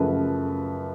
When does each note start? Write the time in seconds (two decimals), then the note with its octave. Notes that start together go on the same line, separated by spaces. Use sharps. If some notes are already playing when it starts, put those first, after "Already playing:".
Already playing: F#2 C#3 F3 A3 B4